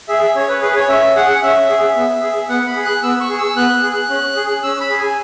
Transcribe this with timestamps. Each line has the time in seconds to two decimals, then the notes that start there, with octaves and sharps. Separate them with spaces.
0.08 G#4 E5
0.35 C#4 C#5
0.48 B4
0.62 G#4 B4
0.76 C#5
0.89 C#4 E5
1.15 G#4 F#5
1.43 C#4 E5
1.69 G#4
1.96 B3
2.22 G#4
2.49 B3 F#5
2.67 B5
2.76 G#4
2.84 F#6
3.03 B3 E6
3.20 C#6
3.30 G#4
3.38 E6
3.56 B3 F#6
3.83 G#4
4.10 C#4
4.36 G#4
4.63 C#4 E6
4.80 B5
4.90 G#4
4.98 G#5